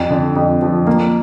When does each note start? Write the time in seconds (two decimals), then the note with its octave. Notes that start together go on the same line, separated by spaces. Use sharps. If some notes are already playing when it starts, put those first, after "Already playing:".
Already playing: F2
0.10 D3
0.36 F2
0.62 F3
0.87 A#3